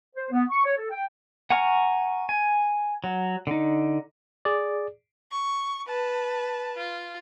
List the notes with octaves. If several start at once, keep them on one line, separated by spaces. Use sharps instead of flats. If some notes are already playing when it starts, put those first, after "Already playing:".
C5
B3
C#6
C#5
A4
G5
F#5 G#5 A#5 C#6 F6
G#5
F#3
D3 D#4
G#4 D5
C#6
B4 A5
F4